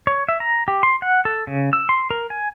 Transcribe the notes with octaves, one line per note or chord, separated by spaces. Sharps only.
C#5
E5
A#5
G4
C6
F#5
A4
C#3
E6
C6
A#4
G#5